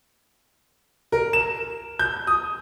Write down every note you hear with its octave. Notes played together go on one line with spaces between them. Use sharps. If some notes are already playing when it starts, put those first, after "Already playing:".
A#4
E7
G6
D#6